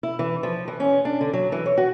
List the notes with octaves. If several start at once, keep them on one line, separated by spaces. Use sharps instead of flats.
E4
E3
F3
E3
C#4
D4
D3
F#3
E3
C#5
F#4